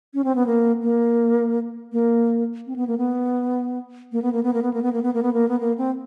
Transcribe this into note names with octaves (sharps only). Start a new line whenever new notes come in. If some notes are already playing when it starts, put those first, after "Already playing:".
C#4
C4
B3
A#3
A#3
A#3
C4
B3
A#3
B3
A#3
B3
A#3
B3
A#3
B3
A#3
B3
A#3
B3
A#3
B3
A#3
B3
A#3
C4